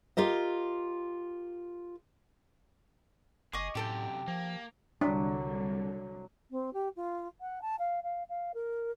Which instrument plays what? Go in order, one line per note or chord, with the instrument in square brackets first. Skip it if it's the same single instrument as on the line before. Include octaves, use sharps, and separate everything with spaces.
[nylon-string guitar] F4 G4 A#4 D#5
[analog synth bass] F#1 [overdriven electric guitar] G#4 [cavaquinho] D#5 C#6 D6
[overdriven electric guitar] F#2 C3 [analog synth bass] A2 [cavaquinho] G4 A4 G5
[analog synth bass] F3 [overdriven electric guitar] A#3
[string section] C2 D3 [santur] F#3 [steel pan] D4
[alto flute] C4
G4
F4
F#5
A5
F5
F5
F5
A#4